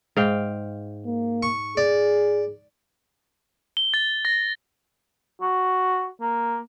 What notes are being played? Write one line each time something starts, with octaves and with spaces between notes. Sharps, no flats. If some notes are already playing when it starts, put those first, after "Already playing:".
G#2 F5 G5
A#3
C#6
G#4 D5
G7
A6
A#6
F#4
A#3